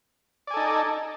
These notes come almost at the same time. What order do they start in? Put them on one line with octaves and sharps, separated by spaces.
D5 G#5 A4 D#4